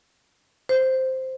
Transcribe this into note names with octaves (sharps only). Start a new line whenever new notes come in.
C5